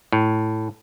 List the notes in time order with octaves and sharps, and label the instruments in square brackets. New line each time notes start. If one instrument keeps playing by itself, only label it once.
[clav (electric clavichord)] A2